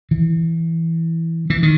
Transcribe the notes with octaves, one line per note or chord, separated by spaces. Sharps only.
E3
E3
D#3